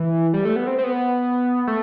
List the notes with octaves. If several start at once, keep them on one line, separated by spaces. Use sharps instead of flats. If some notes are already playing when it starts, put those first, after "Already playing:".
Already playing: E3
G3
A3
B3
C4
C4
B3
A3